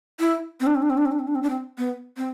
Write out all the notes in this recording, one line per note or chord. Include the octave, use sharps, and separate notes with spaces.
E4
C4
D4
C4
D4
C4
D4
C4
D4
C4
D4
C4
D4
C4
B3
C4